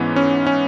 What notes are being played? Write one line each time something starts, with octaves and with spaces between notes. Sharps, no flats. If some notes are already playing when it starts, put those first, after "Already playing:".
Already playing: G#2 E3 B3 C#4
C#4
C#4